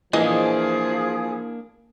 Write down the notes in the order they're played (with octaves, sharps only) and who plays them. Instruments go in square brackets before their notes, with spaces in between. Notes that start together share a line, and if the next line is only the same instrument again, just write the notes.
[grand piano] E3 [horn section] F3 G#4 [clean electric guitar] A#3 D4 [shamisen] D#5